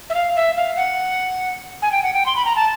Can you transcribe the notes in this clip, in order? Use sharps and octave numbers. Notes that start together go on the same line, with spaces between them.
E5
F5
E5
F5
F#5
G#5
G5
F#5
G5
C6
B5
A#5
A5